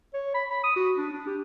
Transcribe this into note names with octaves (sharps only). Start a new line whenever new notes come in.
C#5
B5
B5
D#6
F#4
D4
D4
G4